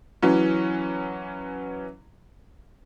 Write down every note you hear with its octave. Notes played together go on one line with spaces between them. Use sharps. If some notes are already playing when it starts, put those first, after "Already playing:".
E3 F#3 C#4